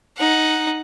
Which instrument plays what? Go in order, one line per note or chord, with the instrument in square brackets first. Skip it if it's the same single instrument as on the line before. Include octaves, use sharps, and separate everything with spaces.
[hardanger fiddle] D#4 F#5